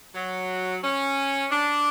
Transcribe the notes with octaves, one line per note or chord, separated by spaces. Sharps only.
F#3
C#4
D4